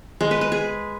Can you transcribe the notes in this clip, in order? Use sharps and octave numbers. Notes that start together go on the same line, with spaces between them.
G#3
B4
B4
G#4